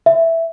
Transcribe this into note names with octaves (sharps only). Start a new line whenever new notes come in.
E5